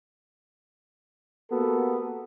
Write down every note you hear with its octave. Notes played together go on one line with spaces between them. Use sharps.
A#3 B3 F#4 G4 A4